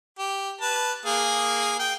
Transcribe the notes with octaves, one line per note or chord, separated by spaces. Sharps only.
G4
B4 A5
A#3 G#4
G5